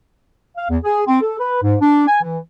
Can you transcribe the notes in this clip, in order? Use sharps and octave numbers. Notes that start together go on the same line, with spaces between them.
F5
E2
G#4
C4
A4
B4
G#2
D4
G#5
E3